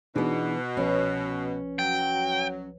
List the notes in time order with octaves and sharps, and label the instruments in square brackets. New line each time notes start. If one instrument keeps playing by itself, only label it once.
[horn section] B2 [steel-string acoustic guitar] E3 B3 [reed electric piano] D4 D#4 G#4
[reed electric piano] C2 F3 B4 [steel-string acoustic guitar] C#4
[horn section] F#3 [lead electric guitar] G5